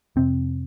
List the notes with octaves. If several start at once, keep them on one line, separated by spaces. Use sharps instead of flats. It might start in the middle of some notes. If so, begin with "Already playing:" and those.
F2 C3 C4